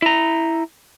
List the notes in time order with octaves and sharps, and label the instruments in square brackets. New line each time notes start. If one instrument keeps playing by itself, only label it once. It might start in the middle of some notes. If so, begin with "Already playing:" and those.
[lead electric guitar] E4 A#5